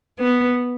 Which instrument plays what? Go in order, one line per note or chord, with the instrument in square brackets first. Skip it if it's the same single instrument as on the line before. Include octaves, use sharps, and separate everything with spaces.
[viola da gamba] B3